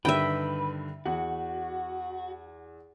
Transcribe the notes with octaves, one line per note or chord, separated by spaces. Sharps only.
G2 D3 D#3 B4 E5 G5
E2 F#4